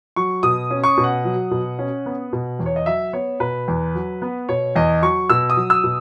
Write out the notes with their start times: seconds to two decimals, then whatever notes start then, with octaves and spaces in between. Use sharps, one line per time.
0.16 F#3 C#6
0.43 B2 D#6
0.70 C#4
0.84 C#6
0.97 B2
1.04 F#5
1.25 F#3
1.51 B2
1.79 C#4
2.06 B3
2.33 B2
2.59 E2
2.66 C#5
2.76 D#5
2.86 F#3 E5
3.13 B3 C#5
3.40 B2 B4
3.68 E2
3.95 F#3
4.22 B3
4.49 B2 C#5
4.76 E2 D#5
5.03 F#3 C#6
5.30 B2 E6
5.50 D#6
5.57 F#3
5.70 E6
5.84 B2